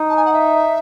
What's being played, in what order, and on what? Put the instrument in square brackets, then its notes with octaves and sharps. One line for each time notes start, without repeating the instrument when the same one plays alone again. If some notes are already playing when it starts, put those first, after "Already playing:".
Already playing: [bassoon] D#4
[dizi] A5
G#5
F#5
E5